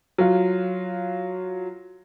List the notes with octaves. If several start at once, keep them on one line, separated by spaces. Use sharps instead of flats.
F#3 F4